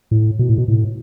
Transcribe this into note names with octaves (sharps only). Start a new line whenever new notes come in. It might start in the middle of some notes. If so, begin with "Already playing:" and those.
A2
B2
A2
B2
A2